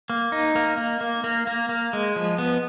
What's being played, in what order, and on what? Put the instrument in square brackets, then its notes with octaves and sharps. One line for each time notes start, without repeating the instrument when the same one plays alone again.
[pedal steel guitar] A#3
D#4
A#3
A#3
A#3
A#3
A#3
A#3
G#3
F3
B3